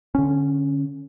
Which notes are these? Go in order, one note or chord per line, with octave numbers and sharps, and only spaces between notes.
D3 C#4